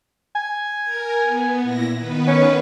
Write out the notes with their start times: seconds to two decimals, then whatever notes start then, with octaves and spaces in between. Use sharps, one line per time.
0.35 G#5
0.83 A#4
1.21 B3
1.63 A#2 E4 A#6
1.95 D#3 B3 B4
2.27 C#4